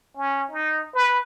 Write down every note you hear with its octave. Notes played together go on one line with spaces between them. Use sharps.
C#4
D#4
B4